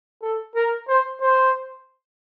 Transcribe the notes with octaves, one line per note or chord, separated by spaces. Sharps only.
A4
A#4
C5
C5